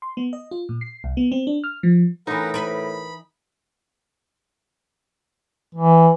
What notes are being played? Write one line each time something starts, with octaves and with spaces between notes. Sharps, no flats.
C6
B3
D#5
F4
A#2
C7
C2
B3
C4
D4
F6
F3
A2 E3 D#4 A#4 B4 F#5
A#4 B4 B5
E3